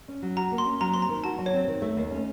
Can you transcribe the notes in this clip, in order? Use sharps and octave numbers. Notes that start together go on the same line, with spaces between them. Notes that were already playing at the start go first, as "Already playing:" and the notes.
C#4
F#3
F#4 A#5
A#3
C6
C#4
F#3 A#5
C4 C6
A#5
D#3
F#4 A5
F#3
C#5
C4
D#3
A3
D#2
C#4